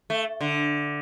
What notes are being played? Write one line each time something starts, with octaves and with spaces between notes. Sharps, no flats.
A3
D3